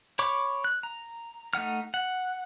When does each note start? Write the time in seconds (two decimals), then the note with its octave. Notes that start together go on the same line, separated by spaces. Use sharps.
0.19 C#5 B5 C#6 D6
0.64 F#6
0.83 A#5
1.53 A3 D#4 F#5 F6
1.94 F#5